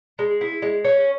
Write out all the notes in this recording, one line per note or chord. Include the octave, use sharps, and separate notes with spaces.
G#3
E4
G#3
C#4